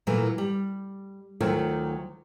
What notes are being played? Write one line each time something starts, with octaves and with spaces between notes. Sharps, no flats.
A#2 E3 F#3 A3
G3
D2 D#3 F#3 A3 F4 C#5